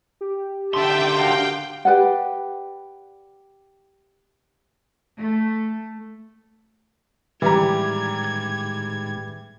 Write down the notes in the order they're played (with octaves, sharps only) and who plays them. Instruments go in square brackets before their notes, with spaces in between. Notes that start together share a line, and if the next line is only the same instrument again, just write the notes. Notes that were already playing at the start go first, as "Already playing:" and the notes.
[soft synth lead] G4
[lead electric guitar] D3 C6 [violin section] E5 A5 [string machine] G5
[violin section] F#4 F5
[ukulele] G4 B4 D5 F#5
[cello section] A3
[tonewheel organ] A2 D#3 G#3 [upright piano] E3 A#5 [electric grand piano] G3 G4 [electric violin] G#6